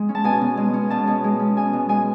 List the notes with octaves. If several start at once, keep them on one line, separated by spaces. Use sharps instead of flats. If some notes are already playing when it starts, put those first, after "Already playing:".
Already playing: G#3
C#4
A5
B2 G#5
B2
G#3
C#4
B2 A5
B2
G#3
C#4
B2 G#5
B2
G#3 G#5